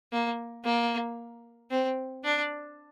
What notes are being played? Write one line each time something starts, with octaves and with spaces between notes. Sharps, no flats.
A#3
A#3
C4
D4